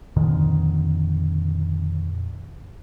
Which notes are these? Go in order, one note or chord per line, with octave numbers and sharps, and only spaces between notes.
F2 A#2 D3 D#3